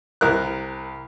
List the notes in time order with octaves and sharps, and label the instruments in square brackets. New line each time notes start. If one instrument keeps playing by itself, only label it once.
[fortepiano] C2 A#4 F#6